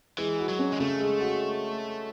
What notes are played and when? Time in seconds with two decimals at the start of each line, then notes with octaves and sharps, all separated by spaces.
0.18 E3 G#3
0.39 F#4
0.49 F#3
0.59 C#4
0.72 G#3
0.80 C#3 A3
1.00 G#3
1.20 F#4